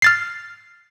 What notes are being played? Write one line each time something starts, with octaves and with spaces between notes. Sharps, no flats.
F6 A6 C7